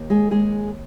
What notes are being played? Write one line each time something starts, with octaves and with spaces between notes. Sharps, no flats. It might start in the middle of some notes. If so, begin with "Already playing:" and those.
Already playing: D#2
G#3 G#4
D#2 G#3 G#4